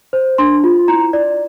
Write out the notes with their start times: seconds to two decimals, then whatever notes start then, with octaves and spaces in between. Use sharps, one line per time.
0.13 C5
0.38 D4 C6
0.64 F4
0.88 E4 A#5
1.13 D5